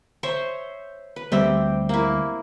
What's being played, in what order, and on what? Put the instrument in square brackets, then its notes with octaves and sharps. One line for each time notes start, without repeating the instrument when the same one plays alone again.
[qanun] C5 C#5 E5
B4
[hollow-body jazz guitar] D2 G3 E5 [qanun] C4 G4
[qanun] A#3 E4